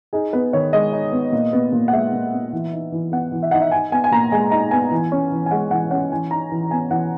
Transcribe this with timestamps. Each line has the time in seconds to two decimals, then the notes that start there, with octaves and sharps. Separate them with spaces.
0.13 D#4 G#4
0.33 B3 B4
0.53 D#3 C#5
0.73 G#3 D#5
0.93 D#4
1.12 B3
1.32 A#2
1.53 B3
1.72 A#2
1.88 F#5
1.92 G#3 E5
2.13 A#2
2.33 B3
2.53 E3
2.73 D#4
2.92 E3
3.12 B3 F#5
3.32 E3
3.43 E5
3.51 D#4 F#5
3.61 E5
3.71 D#4 G#5
3.92 B3 G#5
4.04 G#5
4.11 A#2 A#5
4.32 G#3 G#5
4.51 D#4 A#5
4.71 B3 G#5
4.91 E3
5.12 C#4
5.32 E3
5.46 G#5
5.51 G#3 F#5
5.71 E3 F#5
5.91 C#4 F#5
6.12 E3 G#5
6.31 D#4 A#5
6.52 E3
6.71 B3 G#5
6.90 E3 F#5